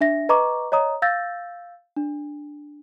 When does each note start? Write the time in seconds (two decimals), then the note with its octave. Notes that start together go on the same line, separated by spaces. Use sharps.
0.01 D4 E5 A#6
0.29 B4 D#5 A#5 C#6 D6
0.72 C#5 D#5 A#5 D#6
1.02 F5 E6 G6 A6 A#6
1.97 D4